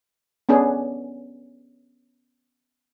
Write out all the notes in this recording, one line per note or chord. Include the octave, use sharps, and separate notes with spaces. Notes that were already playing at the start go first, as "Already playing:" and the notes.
B3 C#4 D4 G#4